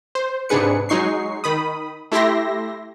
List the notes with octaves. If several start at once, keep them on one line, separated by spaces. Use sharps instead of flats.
C5
G#2 C3 D4 G#4 B4 C#7
F#3 G#3 D#4 C#6 C7
D#3 B5 D#6
A3 E4 G4 E5 C6 A#6